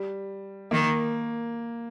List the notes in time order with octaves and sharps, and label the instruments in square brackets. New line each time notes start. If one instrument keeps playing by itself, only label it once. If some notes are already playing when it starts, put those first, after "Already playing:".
Already playing: [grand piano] G3
[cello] D#3 [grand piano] A#3